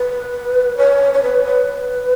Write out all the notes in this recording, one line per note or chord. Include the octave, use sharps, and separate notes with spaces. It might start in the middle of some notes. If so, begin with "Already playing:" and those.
Already playing: B4
C#5
C#5
B4
B4